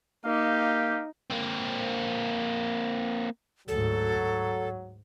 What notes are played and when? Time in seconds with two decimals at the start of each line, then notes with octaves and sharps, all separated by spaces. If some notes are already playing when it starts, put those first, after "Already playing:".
0.25 A#3 D#4 G4 F5
1.30 A#3 C4
3.68 D2 G#2 F#3 A4
4.16 G#2